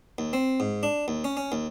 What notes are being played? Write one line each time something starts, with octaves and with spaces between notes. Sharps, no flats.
D#2
C4
G#2
D4
D#2
C#4
C#4
D#2